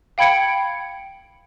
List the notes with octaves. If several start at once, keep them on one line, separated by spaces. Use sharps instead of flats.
F5 G5 B5 G#6 C#7 D7